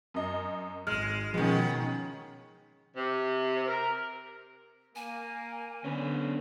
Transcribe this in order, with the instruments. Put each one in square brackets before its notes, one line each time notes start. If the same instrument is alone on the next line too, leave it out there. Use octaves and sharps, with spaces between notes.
[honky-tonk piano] F#2 D#5
[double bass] G#1 [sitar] G#3 [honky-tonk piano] F6
[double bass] B2 C#4 [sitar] D#3 B3 [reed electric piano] F3 [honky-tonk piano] G#3
[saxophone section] C3
A#4
[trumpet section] A#3 [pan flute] G#5
[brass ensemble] D3 [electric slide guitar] B3 C#4